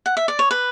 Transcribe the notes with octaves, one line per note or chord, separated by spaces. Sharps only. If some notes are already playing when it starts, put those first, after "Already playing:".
F#5
E5
D5
C#5
B4